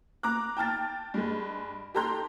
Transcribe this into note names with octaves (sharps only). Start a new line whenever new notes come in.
A#5 D6 F#6
G5 A5 F6 A6
G2 G#3
G4 A4 A#5 C6 G6